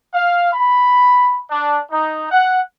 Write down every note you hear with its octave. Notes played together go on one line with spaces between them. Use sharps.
F5
B5
D4
D#4
F#5